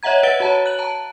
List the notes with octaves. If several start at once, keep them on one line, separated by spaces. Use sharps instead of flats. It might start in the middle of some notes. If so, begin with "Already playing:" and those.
C#5 D#5 E5 F#5 A#5 G#6
B4 F#5 A6 D7 G7
F#4 C#5 A5 A#5
F#6 F#7
A5 A#5